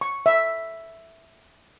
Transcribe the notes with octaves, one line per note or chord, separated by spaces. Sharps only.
C#6
E5